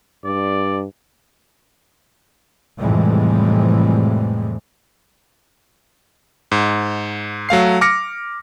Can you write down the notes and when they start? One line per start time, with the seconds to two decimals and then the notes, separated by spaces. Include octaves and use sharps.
0.24 G2 D5
2.78 F2 A2 C3 E3 G3 G#3
6.52 G#2
7.49 F#3 A3 F5 C7
7.81 D6 F6 A#6 C#7